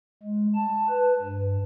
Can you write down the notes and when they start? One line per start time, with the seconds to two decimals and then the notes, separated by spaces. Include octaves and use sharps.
0.23 G#3
0.55 A5
0.90 B4
1.22 G2